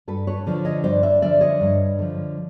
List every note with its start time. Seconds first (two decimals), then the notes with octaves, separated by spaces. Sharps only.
0.08 G2 A4 B4
0.27 B4 C#5
0.47 D3 F3
0.65 C#5 D#5
0.84 G2 C5 D5
1.03 D5 E5
1.22 D3 F3 D5 E5
1.41 C#5 D#5
1.60 G2
1.98 D3 F3